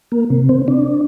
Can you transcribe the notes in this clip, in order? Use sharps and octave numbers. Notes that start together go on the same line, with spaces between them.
A#3
C3
C4
D4